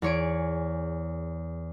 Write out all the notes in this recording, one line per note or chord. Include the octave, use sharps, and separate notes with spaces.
E2 G#4 C#5 C#6 D7